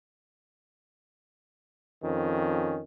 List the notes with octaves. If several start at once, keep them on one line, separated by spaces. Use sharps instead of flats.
F2 D#3 C#4